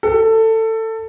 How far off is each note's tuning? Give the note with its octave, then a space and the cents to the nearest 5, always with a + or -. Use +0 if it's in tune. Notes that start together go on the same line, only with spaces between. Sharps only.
A4 +20